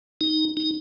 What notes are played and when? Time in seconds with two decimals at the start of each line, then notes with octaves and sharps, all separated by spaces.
0.21 D#4
0.57 D#4